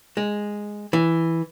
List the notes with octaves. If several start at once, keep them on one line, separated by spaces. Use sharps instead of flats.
G#3
E3